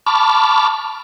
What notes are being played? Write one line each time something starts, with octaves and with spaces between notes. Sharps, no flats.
A5 B5 C#6 D6 F6